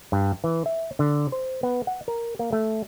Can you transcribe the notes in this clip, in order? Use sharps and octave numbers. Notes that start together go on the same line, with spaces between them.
G2
E3
E5
D3
C5
B3
F#5
A#4
A#3
A3